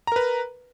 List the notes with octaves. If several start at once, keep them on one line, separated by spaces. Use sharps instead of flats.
A#4 B4 A#5